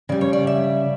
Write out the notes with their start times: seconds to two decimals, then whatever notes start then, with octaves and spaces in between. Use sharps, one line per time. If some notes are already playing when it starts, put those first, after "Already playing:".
0.09 C#3 G3 D5
0.21 C#5
0.33 D5
0.47 E5